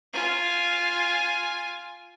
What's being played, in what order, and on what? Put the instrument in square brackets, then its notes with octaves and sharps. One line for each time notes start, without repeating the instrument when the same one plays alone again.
[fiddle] F4 G#5